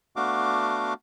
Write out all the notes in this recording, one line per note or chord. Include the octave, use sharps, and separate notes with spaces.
A3 B3 D4 F#4 F5 D6